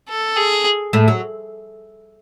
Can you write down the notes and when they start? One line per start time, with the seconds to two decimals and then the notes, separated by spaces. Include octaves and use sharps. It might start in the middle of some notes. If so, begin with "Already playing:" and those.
0.09 A4
0.37 G#4
0.93 A2 A3
1.08 F#3